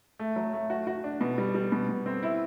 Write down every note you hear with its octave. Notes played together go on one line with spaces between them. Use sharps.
A3
F#3
A3
F#4
F#4
D4
B2
G3
G3
B2
B2
C4
E4